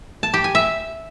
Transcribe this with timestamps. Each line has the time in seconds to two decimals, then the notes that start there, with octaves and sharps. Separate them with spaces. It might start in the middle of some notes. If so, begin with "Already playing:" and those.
0.23 A5
0.34 G4
0.44 G#5
0.55 E5